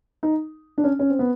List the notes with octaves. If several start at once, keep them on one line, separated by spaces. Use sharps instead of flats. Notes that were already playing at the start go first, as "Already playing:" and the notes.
D#4
D4
C#4
C#4
C4
B3